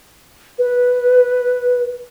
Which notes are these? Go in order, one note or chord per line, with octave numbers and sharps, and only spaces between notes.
B4